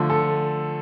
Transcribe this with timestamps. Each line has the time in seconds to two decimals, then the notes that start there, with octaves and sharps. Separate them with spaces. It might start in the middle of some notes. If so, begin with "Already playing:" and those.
Already playing: D3 F3 A3
0.10 A4